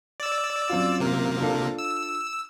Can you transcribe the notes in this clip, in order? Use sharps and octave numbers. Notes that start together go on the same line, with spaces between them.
D5 E6
F#2 C4 F4
C3 A#3
D4 F4 A4
E6